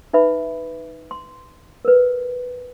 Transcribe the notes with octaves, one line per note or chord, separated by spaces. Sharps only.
D#4 B4 E5 B5
C6
A#4 B4